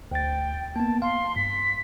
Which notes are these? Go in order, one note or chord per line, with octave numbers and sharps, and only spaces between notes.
D2 G5 A6
A#3 B3 A5
F5 C6
G2 B6